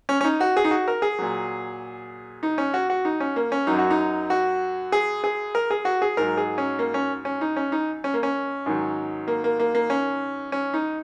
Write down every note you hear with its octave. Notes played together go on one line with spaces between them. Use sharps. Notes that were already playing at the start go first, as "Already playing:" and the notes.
C#4
C#4
D#4
F#4
G#4
D#4
F#4
A#4
G#4
A#2 F#3
D#4
C#4
F#4
F#4
D#4
C#4
A#3
C#4
F#2 F#3 D#4
F#4
D#4
F#4
G#4
G#4
A#4
G#4
F#4
G#4
G#2 F#3 A#4
G#4
C#4
A#3
C#4
C#4
D#4
C#4
D#4
C#4
A#3
C#4
G#2 D#3 F#3
A#3
A#3
A#3
A#3
C#4
C#4
D#4